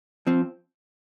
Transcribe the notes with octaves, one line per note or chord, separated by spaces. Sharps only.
F3 C4